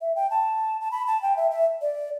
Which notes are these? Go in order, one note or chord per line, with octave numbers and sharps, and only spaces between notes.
E5
G5
A5
A5
B5
A5
G5
E5
E5
D5